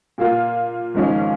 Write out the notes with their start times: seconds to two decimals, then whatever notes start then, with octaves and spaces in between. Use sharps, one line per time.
0.18 A#2 A#3 F4
0.95 G#1 G#2 F3 C#4